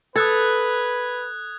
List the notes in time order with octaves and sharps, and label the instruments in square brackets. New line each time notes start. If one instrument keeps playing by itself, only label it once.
[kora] A4 [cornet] B4 [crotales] D#6 F#6 G#6